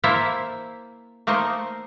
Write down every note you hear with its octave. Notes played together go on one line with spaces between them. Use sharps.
A#3 E4 A4 C5 E5
A3 A#3 D#4 C5 D#5